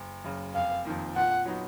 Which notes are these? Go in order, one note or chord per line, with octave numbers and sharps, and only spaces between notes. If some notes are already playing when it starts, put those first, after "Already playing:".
Already playing: F#1
F#2 C#3
F1 F5
F2 D#3 A#3
A#2 F#5
F#3 B3 D#4 F#4